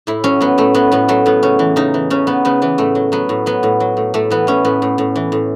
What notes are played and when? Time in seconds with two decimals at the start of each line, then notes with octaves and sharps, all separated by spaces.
0.07 A2 E4
0.24 F#3 C#4
0.41 F#3 B3
0.58 A2 A3
0.74 F#3 B3
0.92 A2 B3
1.08 F#3 A3
1.26 A2 B3
1.43 C#3 C#4
1.59 E3
1.76 C#3 D#4
1.94 E3
2.10 C#3 C#4
2.27 C#3 B3
2.45 C#3 B3
2.62 E3 B3
2.78 A2 A3
2.95 F#3
3.12 F#3 B3
3.29 A2
3.46 F#3 B3
3.63 A2
3.80 F#3
3.97 A2
4.14 A2 A3
4.30 E3 B3
4.47 A2 C#4
4.65 A2 B3
4.82 A2
4.98 A2
5.16 E3
5.32 A2